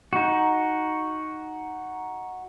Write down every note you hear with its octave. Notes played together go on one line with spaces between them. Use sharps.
D#4 F#4